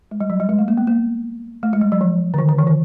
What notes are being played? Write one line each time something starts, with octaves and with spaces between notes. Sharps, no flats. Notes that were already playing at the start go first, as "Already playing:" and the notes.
G#3
G3
F#3
G3
G#3
A3
A#3
B3
A#3
A3
G#3
G3
F#3
F3
D3
D#3
D3
E3
D#3